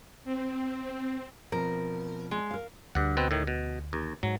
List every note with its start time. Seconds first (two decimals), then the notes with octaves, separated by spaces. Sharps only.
0.24 C4
1.52 B2 F3 C4 A#4
2.31 G#3
2.51 A#4 F5
2.95 D2 G2 F#5
3.17 B2 C4 B4
3.31 A2 D#3
3.47 B2
3.93 D#2
4.23 G#2 F#3